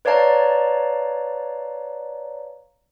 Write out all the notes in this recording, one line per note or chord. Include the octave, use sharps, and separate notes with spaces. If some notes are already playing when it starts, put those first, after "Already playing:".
B4 C#5 D5 F5 A5 A#5